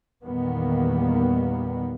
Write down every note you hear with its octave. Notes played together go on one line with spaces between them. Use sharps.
E2 A#2 D#3 G3 A#3 B3